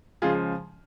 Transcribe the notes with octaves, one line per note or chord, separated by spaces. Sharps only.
C#3 F3 G#3 F4 G#4